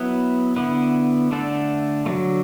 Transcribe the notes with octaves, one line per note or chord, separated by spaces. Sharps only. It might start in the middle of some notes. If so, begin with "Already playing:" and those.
Already playing: F#3 B3 E4 B4
D3 B3 E4 B4
D3 A3 D4 A4
D3 F#3 A3